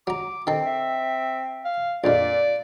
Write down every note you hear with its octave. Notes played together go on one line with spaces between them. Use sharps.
F#3 A#5 D6
D#3 C4 A4
E5
F5
A#1 F2 A#2 D5